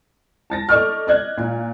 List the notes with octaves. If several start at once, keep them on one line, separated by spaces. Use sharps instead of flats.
A5 A6 A#6
A4 D5 D#5 C#6 D6 F6
D5 D#5 F#6 G#6
A#2